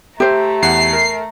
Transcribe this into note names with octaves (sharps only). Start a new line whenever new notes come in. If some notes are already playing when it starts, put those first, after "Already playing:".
A3 G4 C5 E5 A#5
E2 F#5 C7
A#4